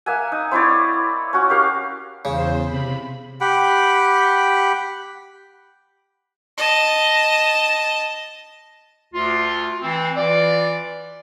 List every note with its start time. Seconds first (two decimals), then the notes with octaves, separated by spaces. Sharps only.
0.06 A#3 E5 F#5 G#5
0.32 D#4
0.51 C4 E4 C#5 D5
1.33 C#4 F#4
1.50 G4 A#4 F5
2.25 E2 C#3 C5
2.65 C3 B5
3.41 G4 F#5 G5 B5
6.58 D#5 A5
9.14 D2 F4
9.82 E3 C4
10.17 E3 F4 D5